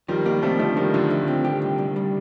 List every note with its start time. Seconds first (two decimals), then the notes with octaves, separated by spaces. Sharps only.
0.08 D#3 F3 G3
0.26 D#3 G3 A#3
0.42 C3 F3 A3
0.59 D3 F3 A3
0.77 D#3 F3 G3
0.94 D3 F3
1.10 A3
1.28 C4
1.44 G4
1.62 C2
1.78 C2
1.96 G3